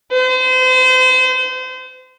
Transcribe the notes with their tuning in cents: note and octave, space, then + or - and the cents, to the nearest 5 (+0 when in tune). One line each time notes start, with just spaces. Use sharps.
C5 -35